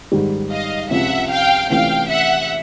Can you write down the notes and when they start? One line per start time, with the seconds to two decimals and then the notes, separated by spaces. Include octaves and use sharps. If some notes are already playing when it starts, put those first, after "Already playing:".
0.12 G#2 D#3 G3
0.51 D#5 F5
0.91 C#2 C3 F3 E5 F#5
1.30 F5 G5
1.70 C#2 C3 E3 A3 C#4 F5 G5
2.10 E5 F#5